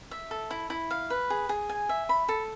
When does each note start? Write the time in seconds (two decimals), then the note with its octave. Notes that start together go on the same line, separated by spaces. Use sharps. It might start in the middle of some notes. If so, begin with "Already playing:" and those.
0.11 E5
0.31 A4
0.51 E4
0.70 E4
0.91 F5
1.10 B4
1.30 G#4
1.49 G#4
1.69 G#5
1.89 E5
2.09 B5
2.29 A4